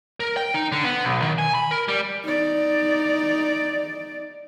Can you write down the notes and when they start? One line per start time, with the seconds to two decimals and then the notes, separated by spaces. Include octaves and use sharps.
0.20 A#4
0.37 G5
0.54 D#4
0.72 D3
0.84 B3
1.05 B1
1.22 D#3
1.38 G#5
1.55 B5
1.71 A#4
1.88 G3
2.24 D#4 D5